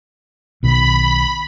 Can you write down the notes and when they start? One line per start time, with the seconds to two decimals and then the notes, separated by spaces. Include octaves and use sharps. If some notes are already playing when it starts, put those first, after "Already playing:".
0.63 B1 B2 D#3 B5